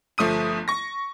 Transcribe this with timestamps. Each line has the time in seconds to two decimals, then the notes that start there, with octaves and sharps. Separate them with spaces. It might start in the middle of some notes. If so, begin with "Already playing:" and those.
0.18 G1 F3 A3 D#6 D#7
0.68 C#6 A#6